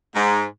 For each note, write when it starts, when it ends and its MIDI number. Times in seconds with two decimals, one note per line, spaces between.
0.16 0.44 44